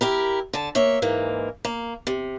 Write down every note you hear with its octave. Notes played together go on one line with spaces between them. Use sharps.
E4 G4 A#4
D3 A5
A#3 C#5 E5
G#2 E3 A#3
A#3
C3